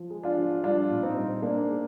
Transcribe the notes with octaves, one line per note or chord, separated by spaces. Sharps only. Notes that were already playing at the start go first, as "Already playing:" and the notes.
Already playing: F3
G#3
D4 F4
F3
G3 D4 F4
A#2
C4 D#4
G3
G#3 A#3 D4
G#3